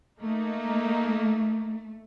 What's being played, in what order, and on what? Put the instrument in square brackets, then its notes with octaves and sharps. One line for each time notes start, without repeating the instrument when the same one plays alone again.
[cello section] A3 [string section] A#3 D#4